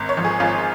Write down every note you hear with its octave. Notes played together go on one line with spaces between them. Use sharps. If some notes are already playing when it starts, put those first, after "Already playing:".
Already playing: G#1
C#5
G#2 F3
G#4
G#1 F4